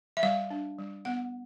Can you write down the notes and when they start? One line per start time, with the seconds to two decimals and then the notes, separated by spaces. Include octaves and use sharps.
0.17 E5
0.23 G3 F5
0.50 D4
0.78 G3
1.05 B3 F#5